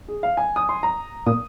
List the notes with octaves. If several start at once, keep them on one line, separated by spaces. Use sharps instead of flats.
G#4
F5
G#5
D#6
C6
A#5
A#2 D#6